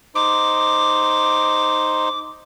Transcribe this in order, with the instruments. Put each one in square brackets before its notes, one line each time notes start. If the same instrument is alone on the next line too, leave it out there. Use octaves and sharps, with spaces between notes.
[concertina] D#4 C5 [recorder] D6